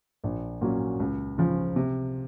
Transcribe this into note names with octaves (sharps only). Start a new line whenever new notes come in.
A#1
A#2 F#3 C#4
C#2
C#3 F3
C3